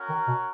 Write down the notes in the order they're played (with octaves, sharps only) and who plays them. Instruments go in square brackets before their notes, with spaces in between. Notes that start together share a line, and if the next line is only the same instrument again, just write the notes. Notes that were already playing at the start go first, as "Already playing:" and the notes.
Already playing: [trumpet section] C#4 F#4 A#4
[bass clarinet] D#3
B2